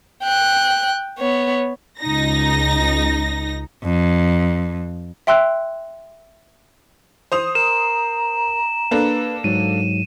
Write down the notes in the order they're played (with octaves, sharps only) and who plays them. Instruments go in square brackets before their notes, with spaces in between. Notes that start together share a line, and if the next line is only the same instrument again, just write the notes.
[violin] G5 F#6
B3 C#5
[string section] C#2 D#4 A#6
[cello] F2
[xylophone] E5 G5 C6 E6 F#6
[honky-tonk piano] C5 D#6 F7
[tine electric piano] A#4 [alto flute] A#5 [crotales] E7
[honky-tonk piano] A#3 D4 A4 [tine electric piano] B4
[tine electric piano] G#2 F#3 [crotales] D#7